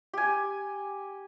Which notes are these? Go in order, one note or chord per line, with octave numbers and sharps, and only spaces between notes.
G4 G#5